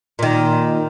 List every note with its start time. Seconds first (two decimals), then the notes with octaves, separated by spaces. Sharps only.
0.19 A#2 D#3